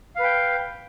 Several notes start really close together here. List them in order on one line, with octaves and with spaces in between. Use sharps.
F5 B4 G5